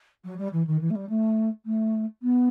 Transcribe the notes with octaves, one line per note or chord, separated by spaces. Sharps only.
F#3
G3
E3
D#3
E3
A3
G3
A3
A3
B3